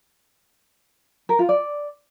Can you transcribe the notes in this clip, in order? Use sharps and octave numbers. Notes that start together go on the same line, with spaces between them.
A#4
F4
D5